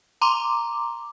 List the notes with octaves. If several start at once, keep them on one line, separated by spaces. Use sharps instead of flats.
A#5 C6 D6